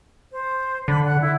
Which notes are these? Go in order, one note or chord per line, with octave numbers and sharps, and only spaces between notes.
C5
D3 B5
F#5
E4